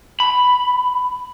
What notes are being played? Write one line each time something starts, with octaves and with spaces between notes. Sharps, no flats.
B5